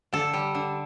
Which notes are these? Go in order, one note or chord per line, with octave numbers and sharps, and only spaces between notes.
D3 A4
G3
D3